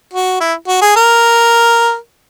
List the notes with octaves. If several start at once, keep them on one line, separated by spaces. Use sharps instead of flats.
F#4
E4
F#4
G#4
A#4